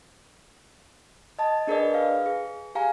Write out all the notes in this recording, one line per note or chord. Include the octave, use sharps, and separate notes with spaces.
D#5 A5
D4 G#4 A#4 B4 D5 D#5
B4 F5
G#4
G4 F5 G#5 A#5